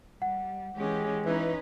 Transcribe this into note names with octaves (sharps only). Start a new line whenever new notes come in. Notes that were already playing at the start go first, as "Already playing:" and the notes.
G3 F#5
E3 G#3 C#4 G4
E3 C#4 D#4 B4